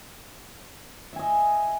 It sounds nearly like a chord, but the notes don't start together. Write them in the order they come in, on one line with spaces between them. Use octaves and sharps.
E5 G#5 D#5